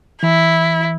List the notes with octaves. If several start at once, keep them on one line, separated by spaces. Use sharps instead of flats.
E3 E4